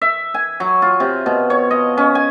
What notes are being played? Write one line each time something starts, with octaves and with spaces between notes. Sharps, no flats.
E5
G#5
F#3
F4
C3
B2
C#5
D#5
C#4
G#5